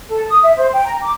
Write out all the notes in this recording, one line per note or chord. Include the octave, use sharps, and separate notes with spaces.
A4
D#6
E5
C5
G5
A#5
D6